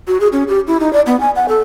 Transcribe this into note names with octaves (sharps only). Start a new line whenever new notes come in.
F#4
G#4
C#4
G4
E4
D#4
D5
B3
G#5
F#5
A4